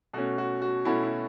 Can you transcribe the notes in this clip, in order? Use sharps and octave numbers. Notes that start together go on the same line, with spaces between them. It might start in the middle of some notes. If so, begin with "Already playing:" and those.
B2 A3 C#4 F#4
F#4
F#4
B2 A3 C#4 E4
E4